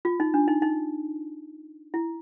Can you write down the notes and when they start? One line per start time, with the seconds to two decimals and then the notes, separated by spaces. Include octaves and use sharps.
0.05 F4
0.20 D#4
0.34 D4
0.48 D#4
0.62 D#4
1.94 E4